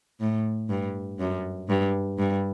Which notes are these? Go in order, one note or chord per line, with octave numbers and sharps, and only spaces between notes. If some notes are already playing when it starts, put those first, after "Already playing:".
A2
G2
F#2
G2
G2